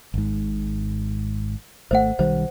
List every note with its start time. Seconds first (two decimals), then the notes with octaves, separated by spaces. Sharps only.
0.14 G#1 G#2
1.91 G#1 A3 C5 F#5
2.19 B1 D#3 G3 C5